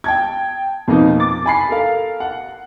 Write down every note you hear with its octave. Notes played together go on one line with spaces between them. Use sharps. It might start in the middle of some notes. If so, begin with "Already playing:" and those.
G5 A5 G#6
F2 B2 A#3 B3 D#4
D6 A6
G#5 B5 C7
A4 A#4 F5
F#5